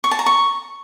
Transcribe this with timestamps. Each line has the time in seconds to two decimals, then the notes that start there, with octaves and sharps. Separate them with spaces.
0.04 C#6
0.11 A5
0.19 A#5
0.26 C#6